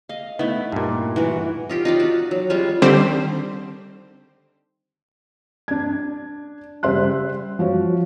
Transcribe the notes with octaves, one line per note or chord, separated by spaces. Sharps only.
D#5 F5
A3 B3 D#4 E4
G2 A#2
E3 F#4 A#4
D#4 F4 G4
D#4 F4 D5
F#4 D5
F#3
G3 G#3 C#4 F4
D3 D#3 G3 C4 G4 C5
D4 G#6
C#3 G3 C5 E5 C6 F#6
F3 F#4 C#5